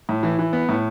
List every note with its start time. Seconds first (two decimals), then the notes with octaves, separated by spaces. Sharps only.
0.09 A2
0.23 E3
0.39 E3
0.53 B3
0.69 A2